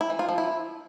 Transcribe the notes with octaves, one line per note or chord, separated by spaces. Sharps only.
E4
E3
F4
F3
E4